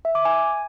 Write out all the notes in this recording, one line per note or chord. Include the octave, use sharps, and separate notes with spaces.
E5
D6
G#5